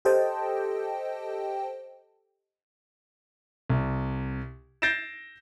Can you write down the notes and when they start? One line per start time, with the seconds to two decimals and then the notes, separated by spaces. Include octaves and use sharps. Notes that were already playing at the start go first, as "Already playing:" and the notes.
0.05 G4 A4 C5 D#5 G5 A5
3.70 C2
4.82 G6 A6 A#6 C7 D7 E7